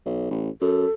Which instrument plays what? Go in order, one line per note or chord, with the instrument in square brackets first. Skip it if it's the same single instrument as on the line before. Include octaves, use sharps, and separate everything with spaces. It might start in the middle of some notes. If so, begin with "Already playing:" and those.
[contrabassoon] B1
A1
[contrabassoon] F#2 [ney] A4